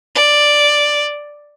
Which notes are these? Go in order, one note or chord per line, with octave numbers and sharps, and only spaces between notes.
D5